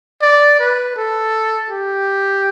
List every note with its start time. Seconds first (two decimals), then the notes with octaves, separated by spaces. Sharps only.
0.22 D5
0.60 B4
0.96 A4
1.71 G4